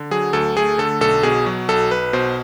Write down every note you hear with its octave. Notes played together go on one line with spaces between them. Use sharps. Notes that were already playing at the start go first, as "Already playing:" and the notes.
Already playing: D3
F#3 G#4
D2 A4
A3 G#4
D3 A4
B1 A4
B2 G#4
F#3
B1 A4
B1 B4
B2 C5